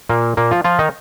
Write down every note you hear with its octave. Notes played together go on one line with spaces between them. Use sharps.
A#2 A#3
A#2 A#3
F3 F4
F3 F4
D#3 D#4